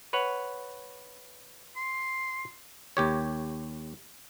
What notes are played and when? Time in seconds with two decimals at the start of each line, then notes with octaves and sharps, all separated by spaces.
0.13 B4 C#5 F#5
1.76 C6
2.97 D#2 G4 C#5